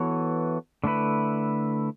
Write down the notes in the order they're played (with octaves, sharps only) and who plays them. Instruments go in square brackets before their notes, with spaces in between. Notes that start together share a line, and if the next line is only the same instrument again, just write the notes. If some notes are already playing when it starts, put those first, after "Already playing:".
Already playing: [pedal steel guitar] E3 B3 F#4 A4 C#5
D3 A3 E4 B4